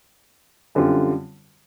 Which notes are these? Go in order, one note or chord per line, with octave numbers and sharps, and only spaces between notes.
F#2 D3 G3 C4 F4